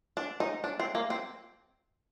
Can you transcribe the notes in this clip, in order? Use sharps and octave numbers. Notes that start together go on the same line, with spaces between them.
D4
D#4
D4
C4
A#3
C4